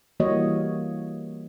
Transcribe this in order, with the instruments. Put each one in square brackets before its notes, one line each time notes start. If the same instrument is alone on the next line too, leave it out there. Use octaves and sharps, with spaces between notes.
[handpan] E3 G3 A#3 F#4 C#5 D#5